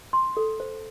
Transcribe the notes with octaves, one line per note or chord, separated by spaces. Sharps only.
C6
A4
C5